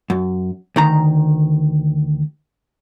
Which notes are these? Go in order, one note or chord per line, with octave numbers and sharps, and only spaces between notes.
F#2
D2 D#3 A#5